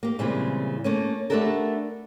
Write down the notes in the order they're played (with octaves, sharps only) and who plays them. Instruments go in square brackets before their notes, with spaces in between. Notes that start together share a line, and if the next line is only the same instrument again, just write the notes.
[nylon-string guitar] A#3 G4
A#2 C#3 E3 G3 G#3 C4
A3 A#3 C#4
A3 B3 D4 G4 A4 A#4